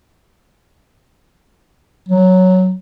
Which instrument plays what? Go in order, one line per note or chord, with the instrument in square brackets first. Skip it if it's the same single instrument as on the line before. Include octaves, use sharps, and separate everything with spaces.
[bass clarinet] F#3